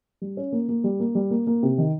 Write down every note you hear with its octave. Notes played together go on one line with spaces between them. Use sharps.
G3
C#4
A#3
A#3
G3
A#3
G3
A#3
A#3
C3
D#3